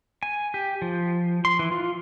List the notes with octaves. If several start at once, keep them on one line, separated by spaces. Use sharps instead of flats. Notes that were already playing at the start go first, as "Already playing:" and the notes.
G#5
G4
F3
C6
E3
F4